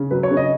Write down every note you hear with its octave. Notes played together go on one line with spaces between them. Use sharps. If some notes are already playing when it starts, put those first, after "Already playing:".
Already playing: C#3
F#3 B4
C#5
C#3
D#5